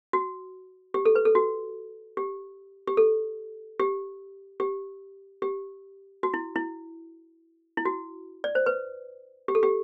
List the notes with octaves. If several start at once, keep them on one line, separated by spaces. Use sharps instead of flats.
F#4
G4
A4
B4
A4
F#4
G4
G4
A4
G4
G4
G4
F#4
E4
E4
E4
F#4
D5
C5
B4
G4
A4
G4